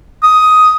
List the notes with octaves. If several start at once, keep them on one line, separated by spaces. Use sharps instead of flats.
D#6